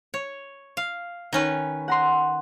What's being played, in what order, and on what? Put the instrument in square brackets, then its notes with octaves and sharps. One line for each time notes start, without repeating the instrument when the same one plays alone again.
[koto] C#5
F5
D#3 C#4 B4
[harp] F#5 A#5 C6